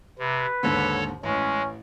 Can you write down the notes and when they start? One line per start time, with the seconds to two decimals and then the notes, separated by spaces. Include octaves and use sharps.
0.19 C3 B4
0.63 D#2 G#2 D3 A4 C#5
1.23 A1 G#3 C#4